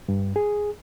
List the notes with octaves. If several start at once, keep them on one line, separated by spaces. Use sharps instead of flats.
G2
G#4